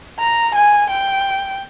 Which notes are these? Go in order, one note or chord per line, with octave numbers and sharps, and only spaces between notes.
A#5
G#5
G5